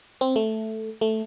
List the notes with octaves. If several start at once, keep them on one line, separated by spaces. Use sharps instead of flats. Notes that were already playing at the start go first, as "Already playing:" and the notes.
C4
A3
A3